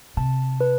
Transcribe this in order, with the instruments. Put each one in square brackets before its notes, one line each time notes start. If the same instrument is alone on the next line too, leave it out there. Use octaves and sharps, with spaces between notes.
[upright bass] C3 [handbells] A5
[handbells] B4